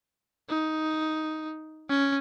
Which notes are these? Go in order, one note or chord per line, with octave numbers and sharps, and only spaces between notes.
D#4
C#4